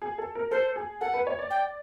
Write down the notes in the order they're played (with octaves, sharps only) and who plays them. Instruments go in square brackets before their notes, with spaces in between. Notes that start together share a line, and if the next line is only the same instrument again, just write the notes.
[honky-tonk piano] G#4
A4
A#4
[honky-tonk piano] A4 [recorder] C5
[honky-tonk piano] G#4
[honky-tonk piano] A4 [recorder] F#5
[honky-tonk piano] B4
C#5
D5
[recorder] G5